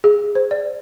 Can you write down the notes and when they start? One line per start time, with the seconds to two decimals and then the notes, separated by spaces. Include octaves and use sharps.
0.04 G#4
0.35 C5
0.51 D5